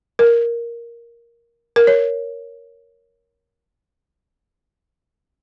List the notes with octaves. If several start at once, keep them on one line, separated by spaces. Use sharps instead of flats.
A#4
A#4
C#5